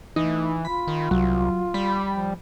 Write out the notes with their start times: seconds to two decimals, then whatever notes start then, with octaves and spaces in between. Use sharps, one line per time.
0.16 E3 A3 D#4
0.65 F4 B5
0.88 D#3
1.11 C2 F#3
1.74 G3 B5
2.14 F3